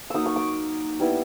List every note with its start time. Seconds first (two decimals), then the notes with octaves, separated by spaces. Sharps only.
0.10 F#3 A#3 D#4 D#6 E6
0.26 C#6
0.36 D6
1.00 G3 B3 E4